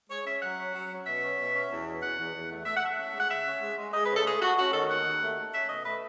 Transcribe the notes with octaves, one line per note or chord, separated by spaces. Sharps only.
G#3 C#5
C#4 E5
F#3 F#5
C#4
F#3
C#4
B2 E5
C#4
B2
C#4
E2
B2
E2 F#5
E2
E2
A3
A3 E5
F#5
A3 E5
C#4
G#3
F#5
C#3 E5
C#4
G#3
G#3
G#3 D#5
B4
C#3
A4
A3 G#4
A3 F#4
C#4 F#4
D#3 A4
D#2 F#5
D#2
A3
A3
C#4 E5
B2 D#5
A3 B4